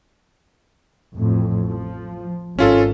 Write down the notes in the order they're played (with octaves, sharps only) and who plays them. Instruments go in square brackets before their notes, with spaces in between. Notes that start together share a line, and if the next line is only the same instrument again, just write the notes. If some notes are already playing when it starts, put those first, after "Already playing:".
[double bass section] A1 F2 A2
F3
[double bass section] G#1 [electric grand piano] C#4 F4 A4